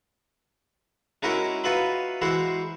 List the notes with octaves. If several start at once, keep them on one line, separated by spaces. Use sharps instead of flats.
G#3 C#4 D#4 E4 F#4 A#4
D#4 F4 F#4 B4 E5 B5
E3 G#3 E4 F#4 C5